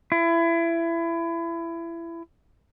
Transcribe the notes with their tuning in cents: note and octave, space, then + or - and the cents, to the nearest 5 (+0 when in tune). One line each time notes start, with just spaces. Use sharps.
E4 +25